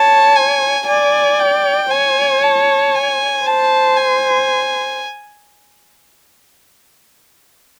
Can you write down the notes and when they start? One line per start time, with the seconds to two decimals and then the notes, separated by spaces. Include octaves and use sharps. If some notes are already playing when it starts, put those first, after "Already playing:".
Already playing: C#5 A5
0.35 G#5
0.86 D5 G#5
1.39 G5
1.90 C#5 G#5
2.43 A5
2.94 G#5
3.45 C5 A5
3.97 G#5